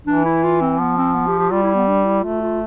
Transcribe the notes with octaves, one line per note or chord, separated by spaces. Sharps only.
E3 D4
E4
F4
C4
F3 B3
C4
B3
G4
G4
G3 F4
E4
B3
D4
E4
A3 F4
F4